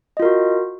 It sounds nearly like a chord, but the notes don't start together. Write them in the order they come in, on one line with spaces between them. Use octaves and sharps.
D#5 F4 A#4 F#4